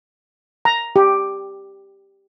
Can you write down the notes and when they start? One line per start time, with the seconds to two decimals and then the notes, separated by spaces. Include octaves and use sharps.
0.65 A#5
0.96 G4